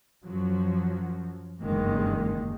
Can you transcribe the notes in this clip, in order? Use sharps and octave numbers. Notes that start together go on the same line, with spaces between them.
F#2 F3 F#3
F#1 E2 G2 D#3 G#3 A#3